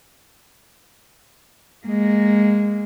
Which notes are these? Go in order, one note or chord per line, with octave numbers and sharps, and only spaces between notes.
G#3 A#3